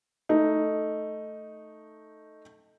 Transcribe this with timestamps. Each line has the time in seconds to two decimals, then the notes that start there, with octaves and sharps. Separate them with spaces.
0.29 A3 D#4